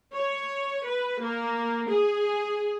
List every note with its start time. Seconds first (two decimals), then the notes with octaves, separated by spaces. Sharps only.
0.14 C#5
0.86 B4
1.22 A#3
1.88 G#4